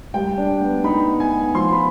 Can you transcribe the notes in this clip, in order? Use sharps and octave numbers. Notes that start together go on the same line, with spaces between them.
G3 G5
D4
B3
D#4 B5
B3
G#5
B3
F3 C6
B5